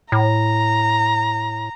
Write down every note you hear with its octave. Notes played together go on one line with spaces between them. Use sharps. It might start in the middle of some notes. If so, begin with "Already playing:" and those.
A2 A#5